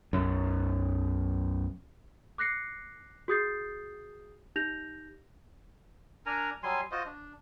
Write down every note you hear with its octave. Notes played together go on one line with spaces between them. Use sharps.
B1 F#2
D6 F#6 A#6 C7 C#7
F#4 G#4 D#6 G6 A6 C7
D#4 G4 G6 A#6 F7
D4 A#4 G#5 A#5
F#3 G3 G#5 C6
F4 F#4 C5 D#5
D4